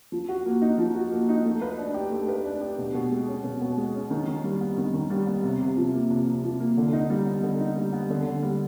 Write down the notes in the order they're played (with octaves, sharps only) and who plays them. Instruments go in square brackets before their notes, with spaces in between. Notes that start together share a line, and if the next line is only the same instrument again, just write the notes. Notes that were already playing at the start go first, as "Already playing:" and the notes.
[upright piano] F3
F#4
A#3
D#4
F3
F#4
A#3
D#4
A3
B4
D4
G4
A3
B4
D4
G4
B2
B2
G#3
C#4
B2
B2
G#3
C#4
D#3
D#3
G3
B3
D#3
D#3
G3
B3
C3
C3
F3
A#3
C3
C3
F3
A#3
D3
D#4
G3
B3
D3
D#4
G3
B3
D3
D3
G3